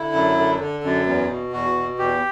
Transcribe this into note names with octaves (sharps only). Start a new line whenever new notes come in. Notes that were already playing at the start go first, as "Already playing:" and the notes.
Already playing: D3 E4
F#2
D3
D3
F#2
E2
B2
E2 F#4
B2
E2 G4